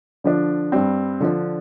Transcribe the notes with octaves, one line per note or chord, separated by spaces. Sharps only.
D3 F3 D4
G2 G3 C4
D3 F3 D4